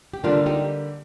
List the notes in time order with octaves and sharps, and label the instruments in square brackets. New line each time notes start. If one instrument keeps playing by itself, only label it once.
[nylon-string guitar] G4
[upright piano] D3 G3 A#3 [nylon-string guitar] D4 F4
[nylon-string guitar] D#4 G4